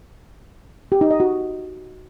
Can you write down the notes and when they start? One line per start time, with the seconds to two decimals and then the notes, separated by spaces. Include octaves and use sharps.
0.92 G4
1.01 D#4
1.11 D#5
1.20 F#4